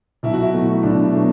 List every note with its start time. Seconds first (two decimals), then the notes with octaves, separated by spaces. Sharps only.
0.23 B1 E4
0.33 F#4
0.42 E4
0.53 B2 F#3 A3
0.83 B1 D4
1.13 B2 F#3 A3